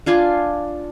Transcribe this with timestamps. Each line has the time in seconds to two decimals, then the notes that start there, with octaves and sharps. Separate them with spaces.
0.06 D4 F4 G#5 C6